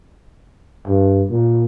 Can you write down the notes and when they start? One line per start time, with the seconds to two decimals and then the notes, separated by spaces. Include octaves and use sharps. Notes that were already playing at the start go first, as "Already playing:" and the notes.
0.87 G2
1.30 A#2